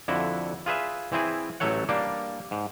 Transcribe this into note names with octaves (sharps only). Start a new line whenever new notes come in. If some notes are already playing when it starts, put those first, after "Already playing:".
F2 D3 E4 F#4
F4 G#4 B4 E5
E3 C4 E4 G#4
A1 F#3 A3 A4 C#5 F#5
G3 A#3 D4
G#2